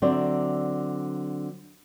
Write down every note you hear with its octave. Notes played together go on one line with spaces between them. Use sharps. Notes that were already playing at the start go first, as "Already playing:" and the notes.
D3 F#3 C4 D5 E5